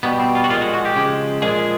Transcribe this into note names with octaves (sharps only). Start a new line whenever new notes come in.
B2 G3 B3
C4
F4
F#4
A#2 F3 G#3 F4
F#4
F#4
G4
C#3 F3 G#3
A#2 F3 G#3 G#4